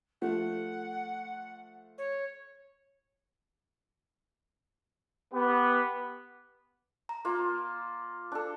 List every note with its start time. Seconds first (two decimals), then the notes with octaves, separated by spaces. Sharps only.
0.22 F3 A3 F#5
1.98 C#5
5.33 B3 G4
7.09 A#5
7.25 A#3 F4
8.32 D4 A4